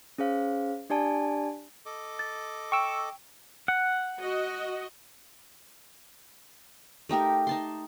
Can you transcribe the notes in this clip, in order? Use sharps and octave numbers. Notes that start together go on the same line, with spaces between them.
C#4 G#4 C5 F5
D4 G4 D5 G#5 A5
A4 D#5 D6
A6
G5 C#6 E6 D7
F#5
F#4 D#5
A3 D#4 G4 A#4
D#4 A5 C6